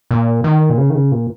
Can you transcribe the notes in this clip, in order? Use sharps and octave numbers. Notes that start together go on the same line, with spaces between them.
A#2
D#3
A#2
C#3
D#3
C#3
A#2